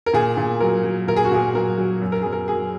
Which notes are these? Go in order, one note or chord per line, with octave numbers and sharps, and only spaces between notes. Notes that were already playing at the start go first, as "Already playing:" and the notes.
A#4
A#2 G#4
A#2
F#3 A#4
F#3
A#2 A#4
G#4
F#4
A#2 G#4
F#3 A#4
F#3
F#2
A#4
F#2 G#4
A#4
F#3 G#4